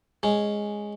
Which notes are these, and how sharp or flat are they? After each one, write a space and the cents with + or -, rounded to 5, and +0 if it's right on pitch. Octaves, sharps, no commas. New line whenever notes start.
G#3 +0 C#4 +0